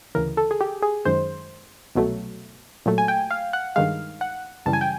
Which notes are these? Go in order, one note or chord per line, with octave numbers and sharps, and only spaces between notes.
D2 C#3 E3 A#4
A4
G#4
G4
G#4
F#2 D#3 G#3 C5
C2 B2 F#3 A3
A#2 F#3 A3
G#5
G5
F5
F#5
G2 D#3 G#3 F5
F#5
F#2 C#3 E3 G3 A5
G#5
G5